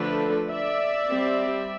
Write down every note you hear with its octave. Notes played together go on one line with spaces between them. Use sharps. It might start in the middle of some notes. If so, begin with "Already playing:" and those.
Already playing: D3 F3 A3 D4 A4 B4
D5 E5
G3 C4